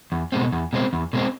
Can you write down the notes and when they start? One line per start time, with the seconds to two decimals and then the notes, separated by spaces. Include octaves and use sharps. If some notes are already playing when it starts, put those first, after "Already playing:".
0.12 E2
0.32 B2 G#3 C4
0.52 E2
0.73 B2 G#3 C4
0.93 E2
1.13 B2 G#3 C4